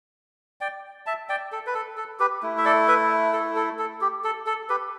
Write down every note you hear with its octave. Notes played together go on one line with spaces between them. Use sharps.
D5 G5
E5 A5
D5 G5
A4
B4
A4
A4
G4 B4
A3 E4
E5
A4 D5
B4 E5
A4
A4
A4
G4
A4
A4
G4 B4